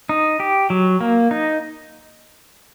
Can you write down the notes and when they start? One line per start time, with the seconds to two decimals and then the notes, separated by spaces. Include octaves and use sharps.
0.09 D#4
0.40 G4
0.70 F#3
1.01 A#3
1.31 D#4